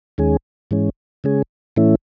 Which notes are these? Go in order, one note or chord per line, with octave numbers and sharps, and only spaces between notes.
D#2 D#3 G#3 C#4 G#4
G#2 E3 G#3 C#4
C#3 G#3 C#4 G#4
A2 E3 A3 C#4 E4